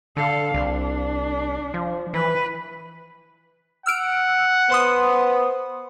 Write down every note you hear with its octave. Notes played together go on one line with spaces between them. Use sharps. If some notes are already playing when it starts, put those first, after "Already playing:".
D3 A4 F5
C2 D4
F3
E3 B4
F#5 E6 F6 D7
B3 C5 C6 D#6